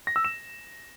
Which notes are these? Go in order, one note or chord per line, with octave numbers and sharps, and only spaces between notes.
A#6
E6
E7